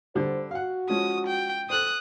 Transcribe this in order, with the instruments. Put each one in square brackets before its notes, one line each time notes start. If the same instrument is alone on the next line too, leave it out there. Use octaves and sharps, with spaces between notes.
[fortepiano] D3 G3 [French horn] C5
[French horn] F#4 [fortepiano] F5 F#5
[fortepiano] F3 G#3 C#4 [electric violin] D#6
[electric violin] G5
[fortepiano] A4 C5 [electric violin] D#6 F#6